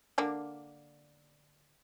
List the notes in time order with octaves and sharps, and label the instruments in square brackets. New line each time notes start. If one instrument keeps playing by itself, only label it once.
[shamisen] D3 A#3 D4